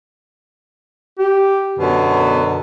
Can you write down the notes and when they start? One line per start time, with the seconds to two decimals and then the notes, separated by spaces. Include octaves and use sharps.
1.19 G4
1.79 F#2 B2 D3 B3